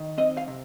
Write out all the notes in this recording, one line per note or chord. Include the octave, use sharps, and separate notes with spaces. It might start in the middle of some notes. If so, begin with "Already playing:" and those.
Already playing: D#3
C4 D#5
F5
C3